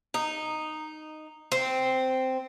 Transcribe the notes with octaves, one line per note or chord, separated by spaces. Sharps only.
D#4
C4